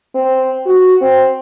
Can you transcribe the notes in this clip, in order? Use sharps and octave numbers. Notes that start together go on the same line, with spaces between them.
C4
F#4
C4